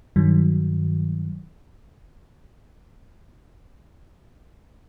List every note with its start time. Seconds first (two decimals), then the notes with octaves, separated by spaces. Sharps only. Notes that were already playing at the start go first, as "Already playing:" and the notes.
0.16 G2 D#3 F#3